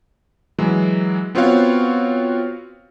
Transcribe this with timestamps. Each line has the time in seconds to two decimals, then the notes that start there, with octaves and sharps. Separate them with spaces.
0.59 E3 F#3 G#3
1.35 B3 C4 F4 F#4 C#5 F5